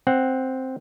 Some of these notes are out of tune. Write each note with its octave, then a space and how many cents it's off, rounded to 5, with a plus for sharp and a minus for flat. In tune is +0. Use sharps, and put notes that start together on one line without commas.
C4 +0 F#5 +0